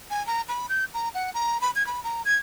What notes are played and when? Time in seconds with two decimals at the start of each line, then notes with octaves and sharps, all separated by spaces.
0.11 G#5
0.27 A#5
0.49 B5
0.69 G6
0.94 A#5
1.15 F#5
1.34 A#5
1.61 B5
1.76 G#6
1.87 B5
2.04 A#5
2.25 G#6